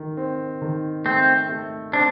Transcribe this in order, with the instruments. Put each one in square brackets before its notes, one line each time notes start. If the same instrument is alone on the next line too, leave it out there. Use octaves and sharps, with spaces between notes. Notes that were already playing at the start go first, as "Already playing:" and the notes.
Already playing: [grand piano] D#3
C4
D#3
[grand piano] A3 [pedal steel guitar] C4
[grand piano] A3
[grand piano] C4 [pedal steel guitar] D4